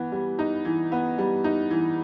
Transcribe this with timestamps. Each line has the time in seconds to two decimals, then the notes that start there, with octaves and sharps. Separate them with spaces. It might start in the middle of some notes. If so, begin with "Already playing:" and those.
Already playing: E3 B3
0.12 G3
0.39 D#4
0.65 E3
0.92 B3
1.18 G3
1.44 D#4
1.71 E3